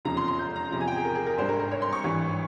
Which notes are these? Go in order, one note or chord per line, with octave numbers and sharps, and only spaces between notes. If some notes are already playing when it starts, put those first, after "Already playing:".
F1 E2 C#3 F3 A#5
C6
C6
G6
A#5
E2 C3 F3 A#5
G#5
G5
G#4
A#4
G#4
A#4
G#1 G2 G3 C5
A#4
A#4
C#5
C6
C#6
G#1 G2 E3 G3